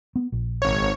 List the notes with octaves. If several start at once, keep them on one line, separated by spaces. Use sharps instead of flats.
B3
A#1
G#1 C#5